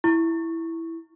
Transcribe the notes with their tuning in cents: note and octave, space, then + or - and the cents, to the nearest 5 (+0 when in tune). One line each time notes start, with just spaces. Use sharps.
E4 +0 C#6 -5